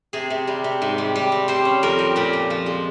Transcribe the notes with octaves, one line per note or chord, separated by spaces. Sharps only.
C3 G#4
C3
G3
C3
G#2
G3
G3
C4
G3 C5
C#4
F2 A#4
G3
A#2 G4
F3
F3
G#3